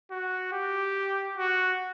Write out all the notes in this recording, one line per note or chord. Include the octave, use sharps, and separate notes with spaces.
F#4
G4
F#4